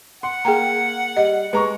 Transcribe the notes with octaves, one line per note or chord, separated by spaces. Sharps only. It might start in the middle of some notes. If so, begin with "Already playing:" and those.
F#5 C6
A#3 G#4 G5 A#5
G3 D#5
G#3 B4 A#5 C#6